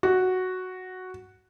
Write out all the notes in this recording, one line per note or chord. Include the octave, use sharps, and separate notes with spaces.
F#4